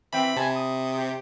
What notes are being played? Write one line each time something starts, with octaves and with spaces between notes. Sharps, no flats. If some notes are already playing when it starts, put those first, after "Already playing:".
E3 C4 E5 G5 B5
C3 G#5 A5 B5
D#6
G4